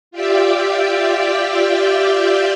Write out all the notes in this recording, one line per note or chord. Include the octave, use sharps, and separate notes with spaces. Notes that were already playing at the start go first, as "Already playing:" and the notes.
F4 G4 D5 E5 G5